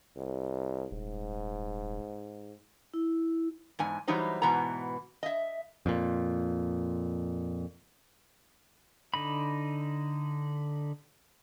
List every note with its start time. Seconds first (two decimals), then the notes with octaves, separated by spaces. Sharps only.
0.17 C2
0.91 D#1 G#2
2.94 E4
3.79 E2 G#2 G#5
4.08 E3 F#3 G3 D#4 C5
4.42 G#2 B2 E3 B3 A#5
5.23 D#5 E5
5.86 F2 A#2
9.14 D3 D#4 B5